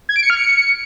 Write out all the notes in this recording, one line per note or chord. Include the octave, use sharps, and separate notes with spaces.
G#6
D7
C#7
F6
C#7